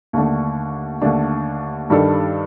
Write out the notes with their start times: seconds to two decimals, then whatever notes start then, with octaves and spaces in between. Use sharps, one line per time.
0.13 D#2 D3 A3 D4
1.02 D#2 D3 A3 D4
1.90 G2 D#3 G3 D4 A4